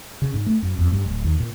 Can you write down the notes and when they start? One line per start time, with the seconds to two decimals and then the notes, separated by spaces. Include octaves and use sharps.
0.22 C#3
0.34 G#2
0.46 A3
0.62 F#2
0.79 F2
0.92 G2
1.06 D1
1.24 D#2
1.40 A#2